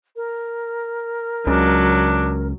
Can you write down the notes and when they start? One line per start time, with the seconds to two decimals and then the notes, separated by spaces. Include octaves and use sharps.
0.16 A#4
1.47 C#2 C#3 F#3 D4